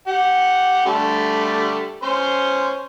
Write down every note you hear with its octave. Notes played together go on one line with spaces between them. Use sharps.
G4 F#5
D3 G3 A3
C#4 C5 C6